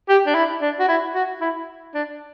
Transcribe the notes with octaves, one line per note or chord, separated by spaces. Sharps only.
G4
D4
E4
D4
F#4
E4
F#4
E4
D4